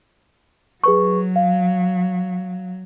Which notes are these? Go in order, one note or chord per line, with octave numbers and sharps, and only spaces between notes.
F#3 G#4 B4 C#6
F5